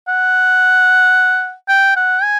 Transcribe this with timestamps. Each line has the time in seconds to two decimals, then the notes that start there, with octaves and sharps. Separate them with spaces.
0.08 F#5
1.68 G5
1.96 F#5
2.23 G#5